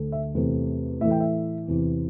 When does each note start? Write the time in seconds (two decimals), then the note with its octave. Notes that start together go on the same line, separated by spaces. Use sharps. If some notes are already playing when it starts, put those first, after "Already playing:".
Already playing: D2 D3 A3
0.12 E5
0.35 E2 C3 A3
1.01 A2 E3 A3 E5
1.11 G5
1.20 E5
1.68 E2 C3 E3